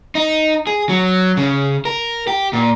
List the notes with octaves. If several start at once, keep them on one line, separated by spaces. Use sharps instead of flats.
D#4
G#4
F#3
C#3
A#4
G4
A#2